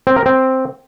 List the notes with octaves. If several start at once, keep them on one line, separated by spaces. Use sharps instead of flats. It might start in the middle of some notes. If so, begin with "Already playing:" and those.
C4
A#4
C4